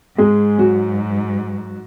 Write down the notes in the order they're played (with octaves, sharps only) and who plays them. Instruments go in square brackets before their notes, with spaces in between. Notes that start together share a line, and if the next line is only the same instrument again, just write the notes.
[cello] G#2 [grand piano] G#3 G#4
[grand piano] F#3 F#4